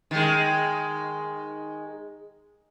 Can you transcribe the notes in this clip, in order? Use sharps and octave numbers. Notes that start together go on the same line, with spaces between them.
D#3 G#3